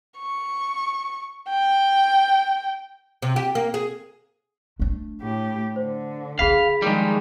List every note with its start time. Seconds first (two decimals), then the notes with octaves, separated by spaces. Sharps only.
0.19 C#6
1.50 G5
3.22 C3
3.36 G4
3.55 A#3
3.74 G#4
4.80 A3 D4
5.21 A2 G4
5.76 D3 C5
6.39 F#3 F4 G#4 F5 B5 B6
6.82 D#3 F3 G3 G#3